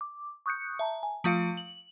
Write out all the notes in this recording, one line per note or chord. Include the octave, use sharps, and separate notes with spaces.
D6
C#6 D#6 F#6 G6 C#7
E5 A5 A#5
G#5
F3 A3 F4 F5 C#7 D7
F#7